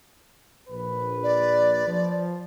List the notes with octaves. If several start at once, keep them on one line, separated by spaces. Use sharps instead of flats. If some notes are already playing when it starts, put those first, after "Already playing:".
A#1 B4
D5
F3